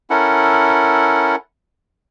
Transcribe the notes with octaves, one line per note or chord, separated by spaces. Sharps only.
C#4 E4 A4 A#4 F#5